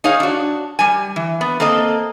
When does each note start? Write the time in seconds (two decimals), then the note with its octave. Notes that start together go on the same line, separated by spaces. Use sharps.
0.04 D#4 G#4 C#5 F5
0.20 D4 F#4
0.79 G3 G#5
1.16 E3
1.41 B3
1.60 A#3 C4 A4 D#5